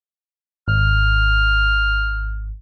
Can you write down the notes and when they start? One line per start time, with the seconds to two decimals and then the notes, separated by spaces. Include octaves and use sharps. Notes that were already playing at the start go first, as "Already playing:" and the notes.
0.68 G#1 F6